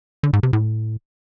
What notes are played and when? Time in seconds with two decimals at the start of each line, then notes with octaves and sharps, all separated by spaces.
0.23 D3
0.33 G#2
0.43 C3
0.53 A2